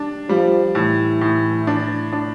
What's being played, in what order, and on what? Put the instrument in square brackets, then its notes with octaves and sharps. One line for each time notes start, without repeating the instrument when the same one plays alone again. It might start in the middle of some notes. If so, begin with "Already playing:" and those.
Already playing: [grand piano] G3 D4
[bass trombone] F3 [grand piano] G3
[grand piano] A2 [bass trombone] E3
[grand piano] A2
D4
D4